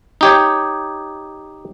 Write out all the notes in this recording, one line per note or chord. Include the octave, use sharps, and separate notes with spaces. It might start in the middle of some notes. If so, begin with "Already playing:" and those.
D#4 G4 C#5